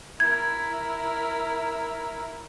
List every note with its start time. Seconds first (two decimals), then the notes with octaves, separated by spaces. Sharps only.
0.20 E4 A#4 G#6